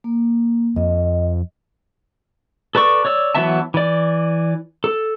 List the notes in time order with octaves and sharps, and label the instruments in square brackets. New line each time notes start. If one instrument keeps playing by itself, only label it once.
[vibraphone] A#3
[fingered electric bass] F2 [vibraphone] D#5
[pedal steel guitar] A4 B4 D5 C#6
C#5 D5 E6
E3 F#3 B3 E5 A5
E3 D5
A4